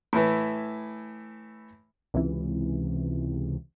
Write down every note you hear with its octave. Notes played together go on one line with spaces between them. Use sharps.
A2 E3
C#2 C3 E3